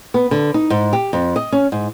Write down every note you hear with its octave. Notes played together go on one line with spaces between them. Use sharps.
B3
D3
D#4
G#2
G4
F2
D#5
C#4
G#2